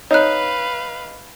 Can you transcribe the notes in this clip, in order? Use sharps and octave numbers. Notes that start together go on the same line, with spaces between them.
D#4 B4 C#5 F5 F#6